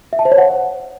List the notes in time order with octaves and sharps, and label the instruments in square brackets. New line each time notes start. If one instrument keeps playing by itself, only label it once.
[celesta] E5
A5
C5
C#5
F#5